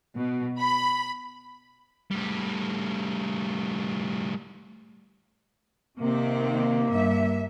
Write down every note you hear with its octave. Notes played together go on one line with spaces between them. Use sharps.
B2
B5
A2 G3
C3 D#3 A#3 C4
G2 E5